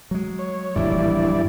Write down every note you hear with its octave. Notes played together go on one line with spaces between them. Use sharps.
F#3 G#3
C#5
D1 A#1 G2 E3 E4 D5